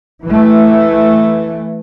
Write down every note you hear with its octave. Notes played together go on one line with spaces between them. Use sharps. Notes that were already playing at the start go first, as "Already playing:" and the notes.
E3 A3